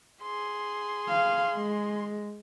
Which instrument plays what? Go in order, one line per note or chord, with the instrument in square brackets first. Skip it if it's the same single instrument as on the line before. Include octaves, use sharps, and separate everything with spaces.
[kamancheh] G#4 C6
[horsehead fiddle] F5
G#3